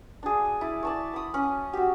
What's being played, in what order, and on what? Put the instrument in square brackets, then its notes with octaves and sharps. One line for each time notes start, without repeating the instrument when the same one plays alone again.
[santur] D4 G#4
E4 D5
D5 A5 C#6
B5 D#6
C#4
F#4 G4